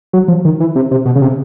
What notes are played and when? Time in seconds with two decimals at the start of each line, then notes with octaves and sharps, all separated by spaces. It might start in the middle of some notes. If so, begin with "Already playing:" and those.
0.13 F#3
0.28 F3
0.45 D#3
0.60 E3
0.75 C3
0.91 C3
1.06 B2
1.16 C#3
1.22 C3